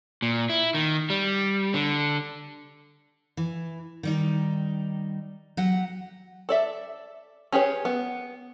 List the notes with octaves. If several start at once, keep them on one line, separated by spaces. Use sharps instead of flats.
A#2
E4
D#3
G3
D3
E3
D#3 G3 D#4
F#3 G4 F#5
A4 D5 E5
C#4 G4 G#4 B4 C#5
B3